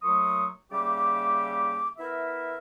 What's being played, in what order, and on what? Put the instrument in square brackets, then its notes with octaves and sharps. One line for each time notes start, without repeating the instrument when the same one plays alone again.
[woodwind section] A#2 F#3 A3 C6 C#6 D#6
C#3 G3 A#3 G4 E5 D6
B3 E4 A#4 E5